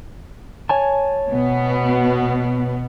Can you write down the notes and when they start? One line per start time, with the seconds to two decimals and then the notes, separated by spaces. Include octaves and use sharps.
0.69 C#5 G#5 A5
1.30 B2 B3